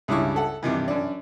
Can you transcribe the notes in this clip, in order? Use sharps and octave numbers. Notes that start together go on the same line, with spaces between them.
C#2 G2 G3 E4 C#6
A4 F#5
G2 C3 D#3 E3
F#2 D4